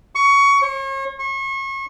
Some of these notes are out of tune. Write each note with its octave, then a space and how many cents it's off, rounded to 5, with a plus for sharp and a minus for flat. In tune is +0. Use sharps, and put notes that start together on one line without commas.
C#6 +20
C#5 -40
C#6 -35